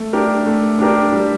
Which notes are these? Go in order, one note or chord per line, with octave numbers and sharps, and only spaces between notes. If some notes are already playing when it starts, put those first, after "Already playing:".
Already playing: A3
D4 G4 A#4
A3
D4 G4 A#4
G3